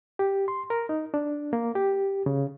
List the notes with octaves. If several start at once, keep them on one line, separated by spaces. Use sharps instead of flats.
G4
C6
A#4
D#4
D4
A#3
G4
C#3